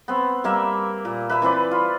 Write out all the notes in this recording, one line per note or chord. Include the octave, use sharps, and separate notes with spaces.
B3 C4
G3 A#3 E5
A#2
B4 E5 B5
E3 C4 B4 D5
F4